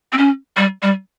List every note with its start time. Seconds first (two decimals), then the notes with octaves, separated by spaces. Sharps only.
0.12 C4
0.18 C#4
0.57 G3
0.82 G3